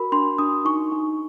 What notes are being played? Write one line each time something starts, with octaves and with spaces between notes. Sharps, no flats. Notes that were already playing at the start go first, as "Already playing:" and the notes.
Already playing: F#4 A#4 B5
D4 C6
D4 D#6
D#4 C#6
D#4